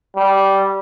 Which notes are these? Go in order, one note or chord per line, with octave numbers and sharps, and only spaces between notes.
G3